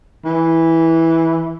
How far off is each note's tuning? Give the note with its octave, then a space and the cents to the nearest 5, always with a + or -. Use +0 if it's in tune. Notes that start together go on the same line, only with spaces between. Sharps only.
E3 -10